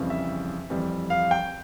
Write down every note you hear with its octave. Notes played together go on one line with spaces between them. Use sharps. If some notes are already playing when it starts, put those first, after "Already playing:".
Already playing: F2 C#3 E3 G3
E5
F2 E3 G3
F5
G5